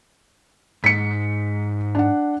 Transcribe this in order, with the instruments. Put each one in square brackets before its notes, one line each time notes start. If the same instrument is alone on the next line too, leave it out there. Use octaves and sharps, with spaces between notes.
[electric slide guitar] G#2 [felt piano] B6 C#7
[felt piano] D4 F#5